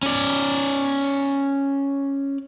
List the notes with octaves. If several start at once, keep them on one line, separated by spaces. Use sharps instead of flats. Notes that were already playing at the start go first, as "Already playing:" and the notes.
C#4 D5